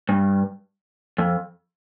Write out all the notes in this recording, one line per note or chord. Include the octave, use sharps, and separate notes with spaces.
G2
F2